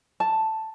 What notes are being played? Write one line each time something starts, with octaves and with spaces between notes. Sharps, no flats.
A5